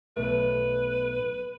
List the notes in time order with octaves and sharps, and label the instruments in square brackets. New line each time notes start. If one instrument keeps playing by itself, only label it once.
[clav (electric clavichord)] B1 A3 [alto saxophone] B4